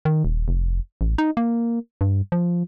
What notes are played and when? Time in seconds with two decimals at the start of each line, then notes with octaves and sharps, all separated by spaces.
0.05 D#3
0.25 D#1
0.48 F1
1.01 A1
1.18 D#4
1.37 A#3
2.01 G2
2.32 F3